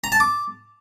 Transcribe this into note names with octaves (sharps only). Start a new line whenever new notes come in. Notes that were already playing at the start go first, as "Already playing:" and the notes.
A#5
A5
D6